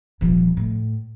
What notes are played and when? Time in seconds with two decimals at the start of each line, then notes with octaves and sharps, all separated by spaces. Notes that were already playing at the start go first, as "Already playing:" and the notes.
0.21 D#1 F3
0.57 A2